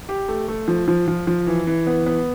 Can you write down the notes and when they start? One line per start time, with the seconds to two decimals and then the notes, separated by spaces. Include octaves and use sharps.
0.09 G4
0.29 A3
0.48 A3
0.68 F3
0.88 F3
1.08 F3
1.27 F3
1.47 E3
1.67 E3
1.87 B3
2.06 B3